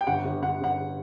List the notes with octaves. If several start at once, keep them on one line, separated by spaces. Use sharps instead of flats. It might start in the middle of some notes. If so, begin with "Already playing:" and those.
G5
G1 F#5
G1
G1 F#5
G1 F#5